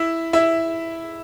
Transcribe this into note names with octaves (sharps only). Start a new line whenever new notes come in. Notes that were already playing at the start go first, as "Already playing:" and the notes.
Already playing: E4 E5
E4 E5